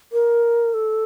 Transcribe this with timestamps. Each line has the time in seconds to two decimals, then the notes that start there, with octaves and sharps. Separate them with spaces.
0.13 A#4
0.74 A4